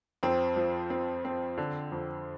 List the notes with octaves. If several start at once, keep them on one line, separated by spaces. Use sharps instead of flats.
F2 C4
F3
C4
C4
D3
F2